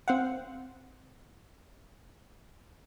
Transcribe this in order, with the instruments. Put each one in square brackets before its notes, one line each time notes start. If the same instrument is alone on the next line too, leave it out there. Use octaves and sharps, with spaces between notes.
[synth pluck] C4 C5 F5 F#5